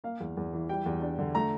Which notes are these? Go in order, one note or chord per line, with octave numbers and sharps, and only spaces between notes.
A#3 F5
E2
E2
E3
G3 G5
E2
D4
D3
A3 A#5